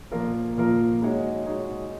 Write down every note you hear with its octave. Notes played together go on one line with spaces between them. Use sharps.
A#2 F3 A#3 F4 A#4
A#2 F3 A#3 F4 A#4
G#3 D#4 F#4 C#5
G#3 D#4 F#4 C#5